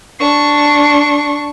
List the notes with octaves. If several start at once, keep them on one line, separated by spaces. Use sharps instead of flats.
D4 C#6